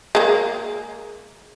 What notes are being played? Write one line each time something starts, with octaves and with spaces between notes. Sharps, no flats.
G#3 A#3